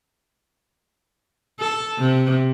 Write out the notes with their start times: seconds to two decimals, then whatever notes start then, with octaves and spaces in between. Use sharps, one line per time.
1.60 A4
1.99 C3